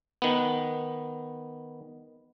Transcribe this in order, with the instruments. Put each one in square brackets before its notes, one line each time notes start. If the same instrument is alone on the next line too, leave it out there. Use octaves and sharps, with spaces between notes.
[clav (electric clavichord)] D#3 B3